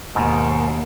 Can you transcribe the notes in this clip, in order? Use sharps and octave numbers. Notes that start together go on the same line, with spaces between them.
D#2 G#2 B2